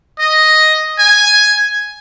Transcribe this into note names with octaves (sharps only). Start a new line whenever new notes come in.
D#5
G#5